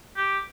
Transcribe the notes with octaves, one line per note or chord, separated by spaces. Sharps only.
G4